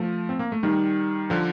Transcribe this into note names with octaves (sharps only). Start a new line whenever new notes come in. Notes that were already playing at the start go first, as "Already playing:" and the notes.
Already playing: F3 A3
C4
A#3
A3
D#3 G3
D3 F3